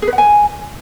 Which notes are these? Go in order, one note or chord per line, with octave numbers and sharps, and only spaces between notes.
G#4
B4
F#5
G#5